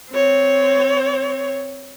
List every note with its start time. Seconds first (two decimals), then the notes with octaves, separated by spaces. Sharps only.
0.11 C4 C#5